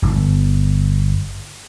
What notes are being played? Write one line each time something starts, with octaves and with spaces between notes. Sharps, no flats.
D1 G1